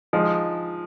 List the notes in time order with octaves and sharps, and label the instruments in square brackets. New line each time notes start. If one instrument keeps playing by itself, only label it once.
[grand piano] F3 G#3 D#4